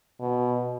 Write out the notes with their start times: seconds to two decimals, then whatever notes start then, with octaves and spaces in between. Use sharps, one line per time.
0.20 B2